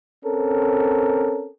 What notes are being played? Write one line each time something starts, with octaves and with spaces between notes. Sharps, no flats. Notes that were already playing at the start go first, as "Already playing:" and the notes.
C4 C#4 A4 A#4